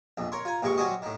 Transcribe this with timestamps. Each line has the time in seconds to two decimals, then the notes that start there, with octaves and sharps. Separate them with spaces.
0.18 A#1 F2
0.32 A#4 C#5 C6
0.45 F4 G#5 A#5
0.62 A#1 G2 G#3 G5 C#6
0.77 F#3 G3 C#4 F#4 C5 D#5
1.02 A2 D#3